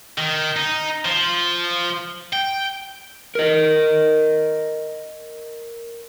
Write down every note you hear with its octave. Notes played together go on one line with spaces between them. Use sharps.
D#3
D#4
F3
G5
A#4 D#5